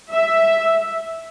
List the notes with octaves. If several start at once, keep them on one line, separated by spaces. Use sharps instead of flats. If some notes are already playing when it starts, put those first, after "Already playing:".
E5